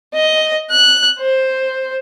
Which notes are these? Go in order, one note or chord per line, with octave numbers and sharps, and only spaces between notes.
D#5
F#6
C5